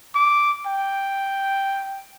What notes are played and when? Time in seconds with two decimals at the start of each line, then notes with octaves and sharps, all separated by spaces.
0.15 D6
0.66 G5